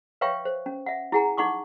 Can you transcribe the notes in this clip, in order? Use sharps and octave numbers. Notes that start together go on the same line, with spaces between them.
B4 C#5 E5 F5 G5 C#6
C5
C#4
E5 F#5
E4 G#4 F#5 G#5 A#5
D#4 F#5 C#6 D6